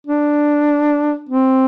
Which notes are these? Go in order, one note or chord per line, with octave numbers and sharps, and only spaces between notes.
D4
C4